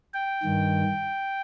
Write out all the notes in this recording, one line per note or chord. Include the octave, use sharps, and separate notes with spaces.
G5
G2 D#3